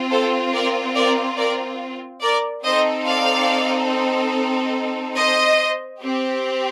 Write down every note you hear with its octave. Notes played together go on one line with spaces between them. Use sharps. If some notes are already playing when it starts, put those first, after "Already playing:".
Already playing: C4 F4
A4 C5
A#4 D5
A#4 D5
A#4 D5
A#4 D5
C4 D#4 A4 C5 D#5
D5 F5
C5 D#5
C4 G4